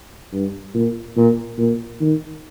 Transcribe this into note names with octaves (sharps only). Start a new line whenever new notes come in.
G2
A#2
A#2
A#2
D#3